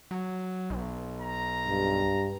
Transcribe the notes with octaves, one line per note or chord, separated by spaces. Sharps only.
F#3
B1
A#5
G2